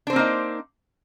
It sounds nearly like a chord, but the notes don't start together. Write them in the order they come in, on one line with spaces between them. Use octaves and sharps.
D4 C5 C4 A#3 D#4